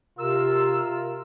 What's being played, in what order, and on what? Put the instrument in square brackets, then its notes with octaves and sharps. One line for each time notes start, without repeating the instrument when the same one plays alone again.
[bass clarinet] C3 [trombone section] F4 A#4 [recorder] E6